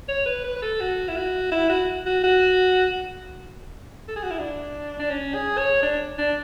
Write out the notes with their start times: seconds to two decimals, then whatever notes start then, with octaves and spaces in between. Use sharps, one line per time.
0.09 C#5
0.26 B4
0.44 B4
0.56 B4
0.62 A4
0.80 F#4
1.08 E4
1.16 F#4
1.52 E4
1.70 F#4
2.06 F#4
2.24 F#4
4.08 A4
4.16 G#4
4.23 F#4
4.31 E4
4.39 D4
4.99 D4
5.10 C#4
5.34 G#4
5.58 C#5
5.82 D4
6.18 D4